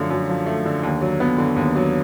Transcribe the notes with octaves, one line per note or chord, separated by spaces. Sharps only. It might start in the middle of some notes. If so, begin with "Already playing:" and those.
Already playing: F#2 D3 F3 A3
F#2
F3
A3
D3
D#2
F#3
B3
D3
D#2
F#3